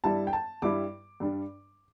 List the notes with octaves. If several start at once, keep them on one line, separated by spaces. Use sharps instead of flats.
G2 G3 E4 A5
G5
A5
G2 G3 E4 D6
G2 G3 D4